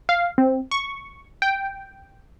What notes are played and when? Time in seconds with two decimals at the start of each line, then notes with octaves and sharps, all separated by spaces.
0.09 F5
0.38 C4
0.71 C#6
1.42 G5